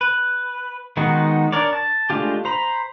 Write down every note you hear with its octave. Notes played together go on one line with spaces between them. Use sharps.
B4
D#3 G#3 B3 D#4 F#4
D4 A#4 C#5 D5
A5
G#3 A3 D4 F4 G4
C5 A#5 B5